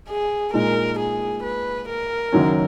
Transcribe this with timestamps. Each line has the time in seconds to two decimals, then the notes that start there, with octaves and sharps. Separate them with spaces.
0.09 G#4
0.53 A#2 G#3 D#4 A#4
0.99 G#4
1.43 B4
1.88 A#4
2.32 F#1 F#2 D#3 F#3 C#4